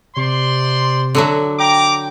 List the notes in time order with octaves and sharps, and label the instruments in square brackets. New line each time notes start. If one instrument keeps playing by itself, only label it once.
[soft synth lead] C3 [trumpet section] C5 D5 C6
[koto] D3 F#3 E5
[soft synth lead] G5 [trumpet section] A#5 D6